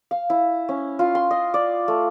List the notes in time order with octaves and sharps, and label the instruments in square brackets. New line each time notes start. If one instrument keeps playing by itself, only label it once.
[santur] F5
E4
C#4
F4
C6
D#5
D5
A3